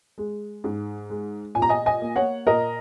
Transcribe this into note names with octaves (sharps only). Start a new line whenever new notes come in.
G#3
G#2
G#3
A#2 G#5
A#5
D#5 G#5
D#5 G#5
A#3
C#5 F#5
A#2 A#4 D#5